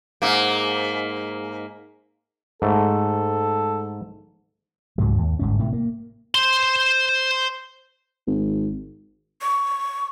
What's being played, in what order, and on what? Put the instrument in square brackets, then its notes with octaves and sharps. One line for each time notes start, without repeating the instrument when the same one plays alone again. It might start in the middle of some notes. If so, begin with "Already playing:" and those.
[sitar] G#2 A#3
[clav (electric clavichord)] G#2 A3 [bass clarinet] A4
[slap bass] C#2 G#2 F#3
D#2
G1 G#2 C#4
A2 C3 D#3
A#3
[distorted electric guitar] C5 C6
[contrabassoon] G#1
[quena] C#6